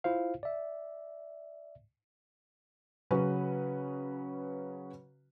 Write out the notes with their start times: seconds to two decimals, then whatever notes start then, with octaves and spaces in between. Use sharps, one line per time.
0.04 E4 F4 C5 F5
0.43 D5 E5
3.11 C#3 F#3 C#4 F#4 B4